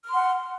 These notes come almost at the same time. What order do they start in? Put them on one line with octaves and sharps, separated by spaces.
F6 C6 F#5